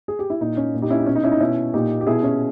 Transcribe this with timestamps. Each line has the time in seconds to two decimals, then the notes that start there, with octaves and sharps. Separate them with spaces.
0.08 G#4
0.19 G4
0.30 E4
0.41 A#2 D#4
0.57 C#4
0.74 A#2
0.82 D#4 G4
0.90 C#4 E4
0.99 D#4
1.06 B2 C#4
1.16 D#4
1.23 C#4 E4
1.32 D#4
1.40 B2 C#4 E4
1.74 A#2 D#4 G4
2.01 G4
2.07 B2 E4 G#4
2.23 C#4 E4